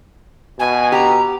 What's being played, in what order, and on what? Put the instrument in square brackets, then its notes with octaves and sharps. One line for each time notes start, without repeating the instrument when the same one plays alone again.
[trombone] B2 [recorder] G#5
[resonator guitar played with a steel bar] G4 [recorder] A#5